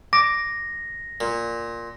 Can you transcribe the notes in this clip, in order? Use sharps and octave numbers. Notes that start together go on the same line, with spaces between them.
D6 A#6
A#2